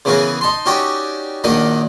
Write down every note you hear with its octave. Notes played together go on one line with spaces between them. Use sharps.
C#3 E3 B3 F#4 G#4 A#4
D#4 A5 C6
C#4 D#4 F#4 G4 C#5 D5
A#1 D#3 F#3 D4 D#5